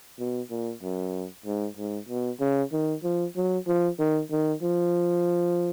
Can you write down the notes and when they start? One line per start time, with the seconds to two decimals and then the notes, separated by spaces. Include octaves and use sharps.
0.19 B2
0.50 A#2
0.83 F#2
1.46 G#2
1.77 G#2
2.09 B2
2.40 C#3
2.72 D#3
3.04 F3
3.36 F#3
3.67 F3
3.99 D#3
4.31 D#3
4.62 F3